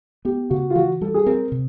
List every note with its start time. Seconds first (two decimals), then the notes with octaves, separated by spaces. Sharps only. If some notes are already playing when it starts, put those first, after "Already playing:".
0.25 B3 G4
0.50 C#3 F#4
0.70 F4
0.76 E3 F#4
1.01 G3 A4
1.14 G#4
1.26 C4 A#4
1.52 C3